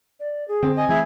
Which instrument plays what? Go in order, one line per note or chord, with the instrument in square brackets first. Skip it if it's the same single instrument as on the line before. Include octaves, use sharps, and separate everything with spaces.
[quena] D5
G#4
[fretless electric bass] D3 [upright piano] C4
[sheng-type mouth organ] D#5 [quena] G#5
[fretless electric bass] E3 A3 [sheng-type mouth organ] E4 G#4